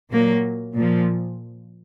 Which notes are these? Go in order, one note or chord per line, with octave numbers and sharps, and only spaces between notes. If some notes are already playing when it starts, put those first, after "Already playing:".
A#2 F#3 A#3
A#2 F3